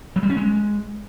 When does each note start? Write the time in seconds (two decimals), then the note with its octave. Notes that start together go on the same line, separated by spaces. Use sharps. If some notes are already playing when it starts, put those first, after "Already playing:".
0.16 F#3
0.23 G3
0.30 C#4
0.37 G#3